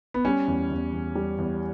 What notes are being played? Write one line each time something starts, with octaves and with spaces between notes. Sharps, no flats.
B3
G3 C#4
E2
E2
E2
G3
E2